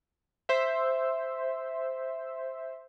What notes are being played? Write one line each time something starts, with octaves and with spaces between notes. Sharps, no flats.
C5 E5